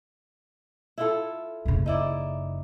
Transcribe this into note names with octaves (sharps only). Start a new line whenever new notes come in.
E4 F4 A4
F#1 C#3
D#4 E4 D5